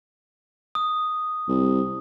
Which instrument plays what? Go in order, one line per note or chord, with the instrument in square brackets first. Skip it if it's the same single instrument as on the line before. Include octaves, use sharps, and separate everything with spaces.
[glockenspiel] D#6
[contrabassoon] C2